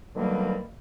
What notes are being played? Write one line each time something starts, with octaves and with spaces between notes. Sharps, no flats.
B2 D3 D#3 F#3 G3 A#3